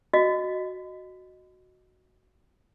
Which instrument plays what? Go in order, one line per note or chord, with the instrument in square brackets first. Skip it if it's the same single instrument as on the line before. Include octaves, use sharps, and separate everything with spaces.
[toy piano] F#4 D#5